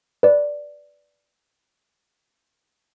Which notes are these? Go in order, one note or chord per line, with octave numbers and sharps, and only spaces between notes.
B4 D5